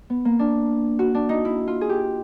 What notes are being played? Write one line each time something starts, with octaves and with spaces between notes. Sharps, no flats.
B3
A#3
D4
F#4
D4
D#4
E4
F4
G#4
G4